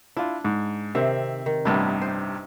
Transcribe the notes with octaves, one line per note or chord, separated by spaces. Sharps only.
D4 E4 F4
G#2
C3 D#3 C4 E5
D#3
A1 G2 C3 B3 D4 D#4
C5